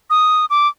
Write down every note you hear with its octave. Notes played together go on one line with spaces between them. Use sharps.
D#6
D6